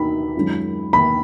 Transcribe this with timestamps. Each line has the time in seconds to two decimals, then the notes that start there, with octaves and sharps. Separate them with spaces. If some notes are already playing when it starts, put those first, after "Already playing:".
Already playing: D#2 D#3 A#3 D#4 F#4 B5
0.35 F#2 D#3 G#3 C#4 F4
0.93 D#2 D#3 A#3 B5